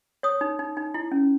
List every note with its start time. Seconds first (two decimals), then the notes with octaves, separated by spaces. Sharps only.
0.23 C#5 D#6
0.41 D#4
0.59 D#4
0.77 D#4
0.94 E4
1.12 C#4